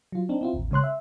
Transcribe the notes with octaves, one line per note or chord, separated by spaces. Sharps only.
F#3 F4
C4 D4 D#4
C4 E4 F4
A1 D#2
C#3 G#3 C#5 C6 F#6
E5